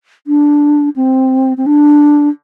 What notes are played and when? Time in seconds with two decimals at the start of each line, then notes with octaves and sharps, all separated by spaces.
0.27 D4
0.96 C4
1.57 C4
1.66 D4